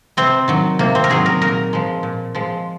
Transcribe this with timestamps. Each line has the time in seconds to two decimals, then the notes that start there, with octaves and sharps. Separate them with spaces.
0.17 C3 C4
0.48 D#3 F#3
0.79 C3 A#3
0.95 C4
1.04 A#4
1.10 D#3 F#3 G#4
1.26 A#4
1.42 A#2 A#4
1.73 F3 G#3
2.03 A#2
2.35 F3 G#3